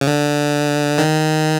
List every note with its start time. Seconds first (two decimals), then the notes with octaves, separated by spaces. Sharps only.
0.01 C#3
0.07 D3
0.98 D#3